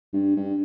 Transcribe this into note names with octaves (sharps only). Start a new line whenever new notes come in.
G2
G2